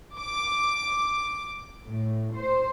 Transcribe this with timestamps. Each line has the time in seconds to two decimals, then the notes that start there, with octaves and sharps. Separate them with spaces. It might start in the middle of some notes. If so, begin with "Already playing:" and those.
0.15 D6
1.85 A2
2.33 C5